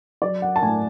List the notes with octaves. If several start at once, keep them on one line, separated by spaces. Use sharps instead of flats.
F#3 D5
F#5
A5
A2 G#5